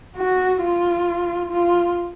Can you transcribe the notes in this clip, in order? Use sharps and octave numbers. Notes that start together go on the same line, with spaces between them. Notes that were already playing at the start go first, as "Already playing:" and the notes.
F#4
F4
F4